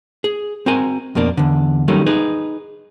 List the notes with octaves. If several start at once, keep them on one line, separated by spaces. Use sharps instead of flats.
G#4
C4 F#4 A#4 G#5
F2 B2 A#3 D4
E2 D3
D#3 F#3 G3 A3 A#3 C#4
D#4 G#4 B4